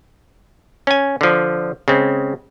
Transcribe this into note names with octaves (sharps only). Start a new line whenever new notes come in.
C#4 G#5
D3 F3
C#3 G#3 C4